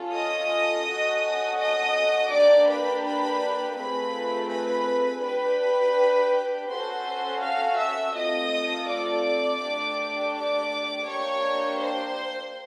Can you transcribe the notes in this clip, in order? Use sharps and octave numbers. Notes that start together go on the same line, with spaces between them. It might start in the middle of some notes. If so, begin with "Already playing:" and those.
Already playing: C#4 F4 A4
D#5 D#6
C#4 F#4 A4
D#5 D#6
A#3 D4 G4 D5 D6
B4 B5
B4 B5
A3 C4 F4 G#4 B4 B5
B4 B5
D4 G4 B4 B5
C#4 F#4 A4 C5 C6
F5 F6
E5 E6
A3 C4 F4 A4 D#5 D#6
D5 D6
A3 D4 G4
D5 D6
A#3 D4 G4 C#5 C#6
C5 C6